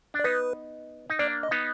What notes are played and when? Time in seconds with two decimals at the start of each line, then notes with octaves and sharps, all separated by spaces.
0.14 D4
0.20 D5
0.24 B3 D#4 B4
1.10 D#4
1.19 A#3 D4 D5
1.43 D#5
1.51 B3 D#4